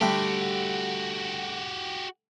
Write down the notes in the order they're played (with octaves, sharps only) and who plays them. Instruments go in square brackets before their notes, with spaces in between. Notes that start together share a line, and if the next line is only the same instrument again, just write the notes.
[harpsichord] D3 G3 A3 [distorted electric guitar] F#4 G4